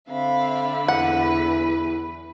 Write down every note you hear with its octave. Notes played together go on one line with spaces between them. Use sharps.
D3 C4 E5 F5 B5
E2 E4 B4 F#5